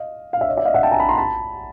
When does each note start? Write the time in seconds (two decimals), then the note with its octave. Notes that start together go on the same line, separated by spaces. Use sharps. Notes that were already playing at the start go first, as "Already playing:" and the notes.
Already playing: D#5 F5
0.33 F5
0.41 E5
0.48 C#5 D#5
0.57 D5 E5
0.65 D#5 F5
0.74 E5 F#5
0.83 G5 A5
0.92 G#5 A#5
1.00 A5 B5
1.09 A#5 C6
1.17 A5 B5